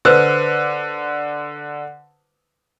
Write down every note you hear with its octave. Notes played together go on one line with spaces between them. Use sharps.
D3 B4 C5 E6